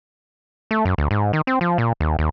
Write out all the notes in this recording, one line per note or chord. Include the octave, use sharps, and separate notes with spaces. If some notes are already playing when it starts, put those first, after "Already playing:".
A3
F#2
D2
G#2
D#3
C4
F3
A#2
D#2
D#2